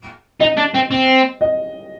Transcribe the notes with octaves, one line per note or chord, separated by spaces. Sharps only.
D#4 D#5
D4
C4
C4
D#5